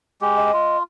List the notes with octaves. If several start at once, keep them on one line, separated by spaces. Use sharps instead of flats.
G#3 G4
D#5
F4